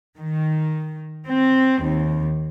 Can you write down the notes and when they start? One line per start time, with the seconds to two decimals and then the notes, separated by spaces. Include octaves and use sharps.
0.18 D#3
1.29 C4
1.82 D#2